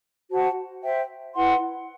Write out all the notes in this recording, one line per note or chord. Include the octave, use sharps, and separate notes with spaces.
F#4 C5 F#5 A5
C5 E5 G5
E4 B4 F#5 C6